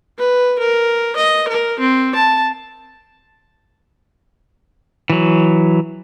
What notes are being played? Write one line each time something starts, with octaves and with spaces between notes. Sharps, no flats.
B4
A#4
D#5
A#4
C4
A5
E3 F#3